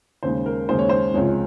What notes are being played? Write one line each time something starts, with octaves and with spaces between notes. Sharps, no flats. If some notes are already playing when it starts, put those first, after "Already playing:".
D#2 C#3 G#3 C5
A#4
D#2 C#3 G#3 C5
C#5
C5
C#2 C3 F3 G#3 C#5